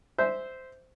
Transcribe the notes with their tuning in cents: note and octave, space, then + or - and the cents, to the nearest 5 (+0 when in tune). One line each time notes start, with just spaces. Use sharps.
C5 -10 E5 -10